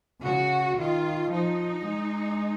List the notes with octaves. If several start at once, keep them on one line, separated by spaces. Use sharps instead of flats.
C#3 F#4
D#3 F4
F3 D#4
G#3